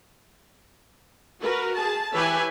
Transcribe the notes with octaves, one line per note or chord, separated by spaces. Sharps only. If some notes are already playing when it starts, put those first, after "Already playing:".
F#4 A#4 B4
G#4 A5
E3 G4 B4 C#5 E5 G#5